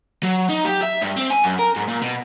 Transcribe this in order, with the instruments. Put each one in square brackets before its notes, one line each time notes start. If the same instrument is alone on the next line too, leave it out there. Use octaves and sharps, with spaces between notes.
[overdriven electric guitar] F#3
D#4
G4
E5
G2
C4
G#5
F#2
A#4
G#2
A#2
B2